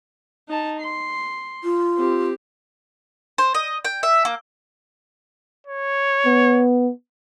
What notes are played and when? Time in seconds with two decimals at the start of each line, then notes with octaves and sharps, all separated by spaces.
0.48 D#4 A5
0.81 C6
1.64 F4
1.97 C4 G4
3.38 C5
3.55 D#5
3.85 G5
4.03 E5
4.25 A#3
5.67 C#5
6.26 B3